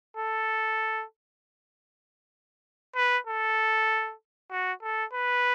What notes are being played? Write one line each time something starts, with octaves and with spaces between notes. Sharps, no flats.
A4
B4
A4
F#4
A4
B4